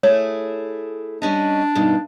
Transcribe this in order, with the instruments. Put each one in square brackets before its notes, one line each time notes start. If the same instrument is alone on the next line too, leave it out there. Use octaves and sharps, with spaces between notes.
[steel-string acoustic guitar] A3 E4 G#4 [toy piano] C#5
[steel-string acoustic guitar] G3 C#4 D#5 [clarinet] D4
[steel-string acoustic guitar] G2 B2 D#3